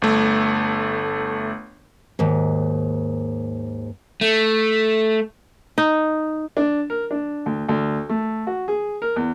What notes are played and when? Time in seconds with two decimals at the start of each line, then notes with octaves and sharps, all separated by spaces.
0.02 G1 A3
2.19 D#2 G#2
4.21 A3
5.78 D#4
6.57 D4
6.90 A#4
7.11 D4
7.46 D2
7.69 D2
8.09 A3
8.47 F#4
8.68 G#4
9.02 A#4
9.16 E2